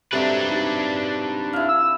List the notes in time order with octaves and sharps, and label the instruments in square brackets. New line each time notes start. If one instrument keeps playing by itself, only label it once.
[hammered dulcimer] C3 F#3 [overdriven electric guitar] D4 B4 [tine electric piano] G4 A4 C5
[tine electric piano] D#4 G4
[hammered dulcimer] E4 F5
[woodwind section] E6